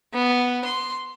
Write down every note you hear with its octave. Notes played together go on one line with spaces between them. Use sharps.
B3
C6